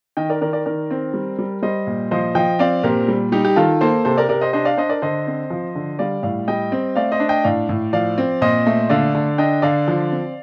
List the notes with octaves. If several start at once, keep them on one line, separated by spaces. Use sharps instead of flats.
D#3 D#5 G5
A#4 D5
D#3 A#4 D5
A#4 D5
D#3 A#4 D5
C4
G3
G3
G3 C5 D#5
A#2
F3 C5 D#5
F3 D#5 G5
C4 D5 F5
A#2 G4 A#4
G3
G3 D#4 G4
G4
D#3 F4 A4
A#3 A4 C5
C3 A4 C5
A#4 D5
C3 A#4 D5
C5 D#5
D4 C5 D#5
D5 F5
D4 C5 D#5
A#4 D5
D3 C5 D#5
C4
F3
D3
G3 D5 F5
A2 D5 F5
G3 D#5 G5
C4
A3 D5 F5
C5 D#5
D4
D#5 G5
A2 D5 F5
A2
F3 D5 F5
C4
A#2 C5 D#5
A3
D3 D5 F5
D3
D4 D#5 G5
D3 D5 F5
F3
C4